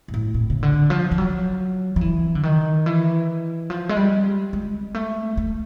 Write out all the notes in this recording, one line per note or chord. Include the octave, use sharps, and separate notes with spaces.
G#2
A2
A2
C#3
D3
F3
F3
F#3
F3
E3
D3
D#3
E3
F3
G#3
G3
G#3
A3
A3